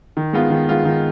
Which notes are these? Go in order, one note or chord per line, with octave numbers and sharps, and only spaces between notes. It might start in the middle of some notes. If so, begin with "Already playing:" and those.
D#3
G#3 B3 F4
D#3
G#3 B3 F4
D#3